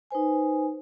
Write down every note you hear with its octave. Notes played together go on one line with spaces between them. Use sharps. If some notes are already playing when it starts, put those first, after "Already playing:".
D#4 B4 C5 G#5